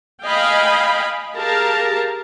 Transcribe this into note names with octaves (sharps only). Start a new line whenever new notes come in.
D#5 F5 G5 G#5 B5
G4 G#4 A#4 F5 A5 A#5